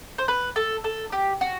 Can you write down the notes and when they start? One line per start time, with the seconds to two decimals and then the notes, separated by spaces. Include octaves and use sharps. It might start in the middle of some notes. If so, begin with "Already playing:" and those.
0.18 C5
0.28 B4
0.56 A4
0.84 A4
1.12 G4
1.41 F#4